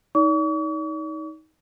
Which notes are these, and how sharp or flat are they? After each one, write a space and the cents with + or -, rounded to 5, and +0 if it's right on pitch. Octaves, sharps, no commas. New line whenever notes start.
D#4 +20 D5 -40 C#6 +45